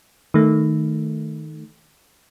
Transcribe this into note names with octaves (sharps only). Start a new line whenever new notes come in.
D#3 A3